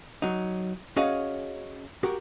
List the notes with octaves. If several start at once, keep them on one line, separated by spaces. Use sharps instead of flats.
F#3 D#4
C#4 F#4 G#4 C#5 D#5 F5
F#4 G4 A#4